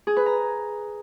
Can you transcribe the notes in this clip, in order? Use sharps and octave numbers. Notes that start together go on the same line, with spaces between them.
G#4
B4
A#5